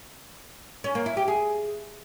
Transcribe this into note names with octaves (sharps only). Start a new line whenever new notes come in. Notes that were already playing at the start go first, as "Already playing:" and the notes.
C#4
A#3
E4
G4
G#4